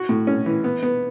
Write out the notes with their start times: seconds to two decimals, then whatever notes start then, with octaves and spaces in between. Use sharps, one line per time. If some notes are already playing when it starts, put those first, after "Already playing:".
Already playing: F#4
0.09 A2
0.27 C#4
0.46 E3
0.64 B3
0.83 B3